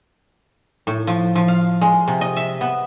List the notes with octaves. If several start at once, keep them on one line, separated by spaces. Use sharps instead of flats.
A2
F3
F3
F5
G#3
C3
D#5
E5
B3